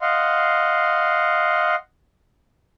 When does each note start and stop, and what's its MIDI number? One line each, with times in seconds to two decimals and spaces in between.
0.01 1.75 75
0.01 1.75 77
0.01 1.75 78
0.01 1.75 84